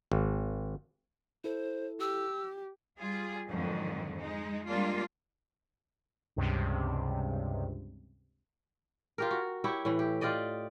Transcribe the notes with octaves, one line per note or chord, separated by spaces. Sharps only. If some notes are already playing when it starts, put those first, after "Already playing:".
G#1
E4 A4 C5
G4 E6
G3 F4 G#4
F2 G#2 D3 D#3 F#3
G#3 D#4
G3 G#3 A#3 D4 F4
C#2 G2 C3
F4 G4 A#4
F#4
E4 G4 C#5
A2 E3
G4
F4 G4 D5 D#5